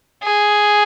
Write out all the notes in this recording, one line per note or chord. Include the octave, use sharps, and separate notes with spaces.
G#4